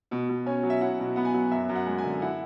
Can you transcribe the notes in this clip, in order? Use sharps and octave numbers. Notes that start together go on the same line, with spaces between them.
B2
B2
C#4 G#5
F#3
E5
E4 F#5
B2
B3 F#5
G#5
F#3 F#5
F#2 E5
F#2
F#5
G#3
G#5
D3
E4 F#5